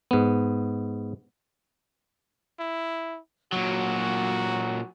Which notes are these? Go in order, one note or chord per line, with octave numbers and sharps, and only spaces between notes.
G#2 B3
E4
A#2 F#3 F#4